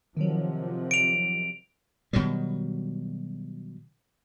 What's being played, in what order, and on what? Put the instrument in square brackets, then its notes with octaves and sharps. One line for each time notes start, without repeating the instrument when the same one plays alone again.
[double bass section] C3 F3 [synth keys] D#3 F#3
[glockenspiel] D7 F7
[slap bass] B2 D#3 F#3 G3